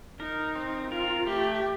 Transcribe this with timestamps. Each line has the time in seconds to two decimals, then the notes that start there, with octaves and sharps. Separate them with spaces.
0.20 D#4 A#4
0.55 C4
0.91 F4 A#4
1.27 A3 G4